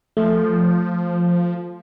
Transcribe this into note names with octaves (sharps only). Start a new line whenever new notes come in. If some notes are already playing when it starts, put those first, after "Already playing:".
F3 A3